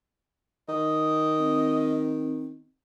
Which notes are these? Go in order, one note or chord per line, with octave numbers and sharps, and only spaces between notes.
D#3 D#5
C4